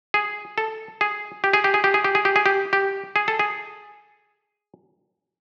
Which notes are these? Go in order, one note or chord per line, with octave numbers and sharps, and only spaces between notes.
G#4
A4
G#4
G4
G#4
G4
G#4
G4
G#4
G4
G#4
G4
G#4
G4
G4
G#4
A4
G#4